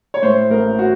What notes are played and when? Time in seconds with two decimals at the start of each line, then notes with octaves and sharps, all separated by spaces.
0.14 C#5
0.23 A2 C5
0.50 A1 A#4
0.79 F#4